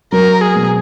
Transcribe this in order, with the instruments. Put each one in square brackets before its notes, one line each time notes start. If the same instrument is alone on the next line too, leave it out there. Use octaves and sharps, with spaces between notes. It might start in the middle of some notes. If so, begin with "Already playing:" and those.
[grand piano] F#3 [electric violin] A#4
[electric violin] G#4
[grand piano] B2